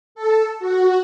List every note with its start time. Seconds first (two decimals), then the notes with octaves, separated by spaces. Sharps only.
0.15 A4
0.59 F#4